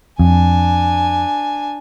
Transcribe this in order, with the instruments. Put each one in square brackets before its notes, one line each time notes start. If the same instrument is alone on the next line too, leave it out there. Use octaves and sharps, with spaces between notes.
[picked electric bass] F2 [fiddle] D4 G#5